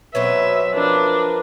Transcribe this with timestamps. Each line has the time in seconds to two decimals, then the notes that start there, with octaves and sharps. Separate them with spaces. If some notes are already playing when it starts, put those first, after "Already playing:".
0.15 B2 F#3 C4 C#4 B4 E5
0.74 F3 D4 A#4 B4